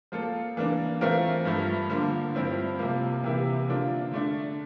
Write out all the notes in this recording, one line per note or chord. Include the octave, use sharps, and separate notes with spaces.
F3 A#3 F4 A4
E3 A#3 D4
E3 A3 C4 F4 A#4
G2 F3 A3
D3 F3 A#3
G2 F3 C4 E4
C3 F3 A#3
C3 E3 A#3 E4 G4
D3 F3 A#3 D4 F4
D3 A3 D4